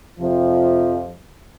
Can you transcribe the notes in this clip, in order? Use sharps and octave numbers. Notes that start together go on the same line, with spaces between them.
F2 C3 F3